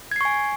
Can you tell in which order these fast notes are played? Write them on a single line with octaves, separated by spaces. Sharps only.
G#6 C7 C#6 G#5